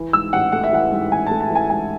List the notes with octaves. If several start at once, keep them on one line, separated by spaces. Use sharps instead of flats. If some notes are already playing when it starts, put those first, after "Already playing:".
Already playing: E3
G#2 E6
A1 F#5
A3 F#5
E5
E3 F#5
G#2
A1 G#5
A5
A3
A5
E3
G#5
G#2 G#5